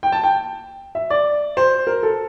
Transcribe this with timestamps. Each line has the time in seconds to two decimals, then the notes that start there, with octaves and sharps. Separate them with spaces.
0.03 G5
0.12 A5
0.23 G5
0.95 E5
1.10 D5
1.57 C5
1.87 A#4
2.03 A4